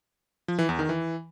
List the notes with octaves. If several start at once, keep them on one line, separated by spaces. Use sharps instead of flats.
F3
E3
E2
D#3
E3